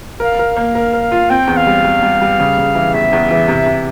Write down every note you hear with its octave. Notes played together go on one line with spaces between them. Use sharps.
A#4 F5
A#4
A#3
A#4
A#4
F4
C4 G5
E2
F5
G3
G3
G3
G3
C#3
C#3
E3
E2 E5
E2
E3
C3
C3